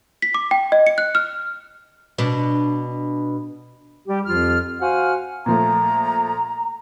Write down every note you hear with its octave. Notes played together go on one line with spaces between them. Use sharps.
B6
D6
G5
D#5
C#7
F#6
F6
B2 D4
G3 G4
F2 F3 F4 G4 F6
F#4 C5 F5 F#5 G#5 F6
A#2 F3 A3 A#5